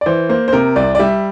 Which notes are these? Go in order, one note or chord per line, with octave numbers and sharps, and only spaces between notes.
D5
E3 C5
A#3 C5
C5
C3 A#4
C2 D5
D5
G3 E5